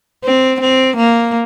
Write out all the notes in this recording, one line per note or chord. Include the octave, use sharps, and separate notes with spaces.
C4
C4
A#3